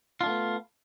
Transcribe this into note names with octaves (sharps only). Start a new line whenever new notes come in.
A3 B3 D4 F4